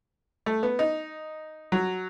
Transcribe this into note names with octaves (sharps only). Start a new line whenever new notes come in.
A3
B3
D#4
F#3